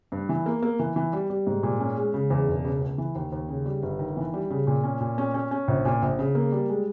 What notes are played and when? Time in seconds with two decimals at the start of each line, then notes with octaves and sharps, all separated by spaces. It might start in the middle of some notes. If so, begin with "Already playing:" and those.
0.12 G2
0.29 E3
0.46 A#3
0.63 A#3
0.79 E3
0.96 E3
1.13 G3
1.30 G3
1.47 G#2
1.63 A#2
1.80 C#4
1.97 G#3
2.14 C#3
2.30 E2
2.48 E1
2.65 C#3
2.81 C#2
2.98 E3
3.15 D#2
3.32 D#2
3.49 C#3
3.66 G3
3.83 G1
3.99 D#3
4.17 E3
4.34 G3
4.51 C#3
4.67 A#2
4.84 C#4
5.00 A#2
5.18 C#4
5.34 C#4
5.51 C#4
5.68 A#1
5.85 A#2
6.02 A#1
6.19 C#3
6.35 A#3
6.52 G3
6.69 G#3